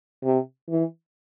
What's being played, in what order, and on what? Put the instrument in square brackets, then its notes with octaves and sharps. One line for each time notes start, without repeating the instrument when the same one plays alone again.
[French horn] C3
E3